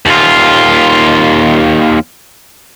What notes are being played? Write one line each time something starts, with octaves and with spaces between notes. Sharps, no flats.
D#2 F4